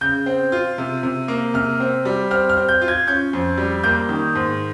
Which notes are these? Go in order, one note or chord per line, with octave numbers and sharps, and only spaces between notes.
C#3 G6
C4
F4
C3
C3
A#3
C3 F6
C4
G3
C4 F6
F6
C4
G6
F4
G#6
C#4 G6
F2
G3
A#3 G6
D#3
G#2